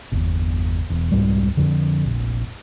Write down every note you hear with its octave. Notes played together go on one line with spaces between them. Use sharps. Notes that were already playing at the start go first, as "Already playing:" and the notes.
G1 E2
E1
C2 F2 G#2 G3
F2 D3
F1 A#1